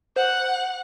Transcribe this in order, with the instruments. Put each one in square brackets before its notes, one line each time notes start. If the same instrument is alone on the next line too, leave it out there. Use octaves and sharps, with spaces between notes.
[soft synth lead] C5 [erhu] F#5